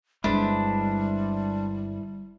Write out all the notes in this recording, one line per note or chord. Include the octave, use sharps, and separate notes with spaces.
G1 E2 G3 G#3 D4 E4 B4 C5